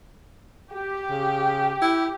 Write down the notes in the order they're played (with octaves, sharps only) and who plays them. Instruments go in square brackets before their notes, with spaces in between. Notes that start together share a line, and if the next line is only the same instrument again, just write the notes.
[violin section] G4
[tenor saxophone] C#3
E4